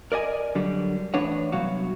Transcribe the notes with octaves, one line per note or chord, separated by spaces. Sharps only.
A#4 D5 D#5 G#5
D3 F#3 G3
A2 E3 D4 B4 C#5 F#5
C2 B2 F#3 F#4 F5